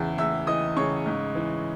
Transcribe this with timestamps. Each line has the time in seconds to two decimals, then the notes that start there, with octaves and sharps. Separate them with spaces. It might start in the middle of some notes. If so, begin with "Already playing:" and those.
Already playing: E2 C#3 E3 E5
0.18 E2 E5 E6
0.47 E3 D#5 D#6
0.76 C#3 C#5 C#6
1.06 G#2
1.35 E3